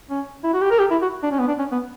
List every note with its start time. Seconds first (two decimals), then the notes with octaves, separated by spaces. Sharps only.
0.10 C#4
0.44 E4
0.53 F#4
0.61 G4
0.71 A#4
0.79 G4
0.91 E4
1.02 F#4
1.23 D4
1.32 C#4
1.39 B3
1.48 D4
1.59 C#4
1.72 B3